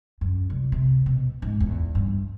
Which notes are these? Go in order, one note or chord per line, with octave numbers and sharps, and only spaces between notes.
F#2
C2
C3
B2
G#2
E2
G2